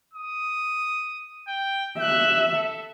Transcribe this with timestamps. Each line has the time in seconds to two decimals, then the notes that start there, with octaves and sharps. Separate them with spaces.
0.13 D#6
1.47 G5
2.00 E5 F#6
2.54 A4